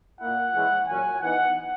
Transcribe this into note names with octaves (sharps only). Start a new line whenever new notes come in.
A#2 A#3 E4 F#5
E3 G#3 C#4 E4
A#2 F#3 C#4 G#5
E3 B3 D#4 F#5